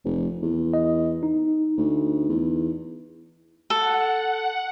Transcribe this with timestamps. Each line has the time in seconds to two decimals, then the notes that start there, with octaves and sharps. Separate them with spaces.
0.05 F1
0.43 E2
0.74 D#5
1.23 D#4
1.78 D2
2.29 E2
3.70 A4 F#5